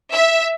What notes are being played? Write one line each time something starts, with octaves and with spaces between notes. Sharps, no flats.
E5